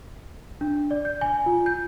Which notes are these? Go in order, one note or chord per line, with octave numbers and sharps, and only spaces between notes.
D4
D5
G6
G#5
F4
G6